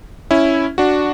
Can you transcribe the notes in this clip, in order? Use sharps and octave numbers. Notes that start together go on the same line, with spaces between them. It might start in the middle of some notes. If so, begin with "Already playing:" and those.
C#4 E4
D4 F#4